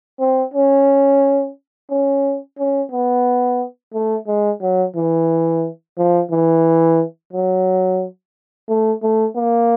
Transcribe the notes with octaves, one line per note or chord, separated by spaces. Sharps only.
C4
C#4
C#4
C#4
B3
A3
G#3
F#3
E3
F3
E3
F#3
A3
A3
A#3